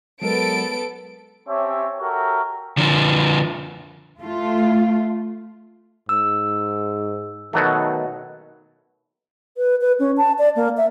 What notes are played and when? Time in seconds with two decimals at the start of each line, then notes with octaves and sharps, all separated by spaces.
0.22 F#3 G#3 B3 A4 A#4 D7
1.49 C4 C#4 G4 C#5 E5 A5
2.00 F#4 G4 A4 A#4 C#5 E5
2.78 D3 F3
4.21 A3 F4
6.09 G#2 E6
7.53 B2 D#3 F#3 A3
9.57 B4
9.81 B4
9.99 C#4
10.17 A5
10.39 D5
10.56 A#3
10.77 E5